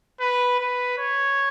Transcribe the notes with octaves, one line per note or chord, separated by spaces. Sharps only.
B4
B4
C#5